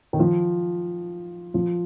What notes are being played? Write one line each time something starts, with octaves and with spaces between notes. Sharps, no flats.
D#3
F3
F3